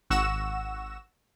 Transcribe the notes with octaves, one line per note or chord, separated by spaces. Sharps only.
G#1 F#5 C#6 E6 A#6 E7